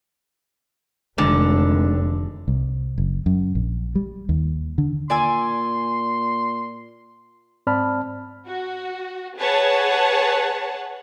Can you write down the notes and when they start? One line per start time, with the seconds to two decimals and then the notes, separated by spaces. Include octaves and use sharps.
1.18 F1 G#2 D3 D#3 D4
2.48 C2
2.98 F#1
3.26 F#2
3.55 A#1
3.95 G3
4.29 D#2
4.78 D3
5.10 A#2 D5 G#5 C6 E6
7.67 G#2 C4 D5 A5 B5 F6
8.48 F#4
9.38 G#4 B4 C#5 F#5 A5